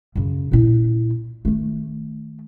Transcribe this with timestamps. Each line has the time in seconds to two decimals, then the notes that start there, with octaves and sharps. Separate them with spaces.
0.15 F#2 C#3
0.51 A#2 E4
1.45 D#3 A3